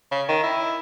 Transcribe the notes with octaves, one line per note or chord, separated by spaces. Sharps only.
C#3
D#3
E4